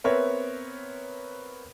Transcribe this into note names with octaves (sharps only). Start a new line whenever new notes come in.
B3 C4 A#4 B4 C#5 E5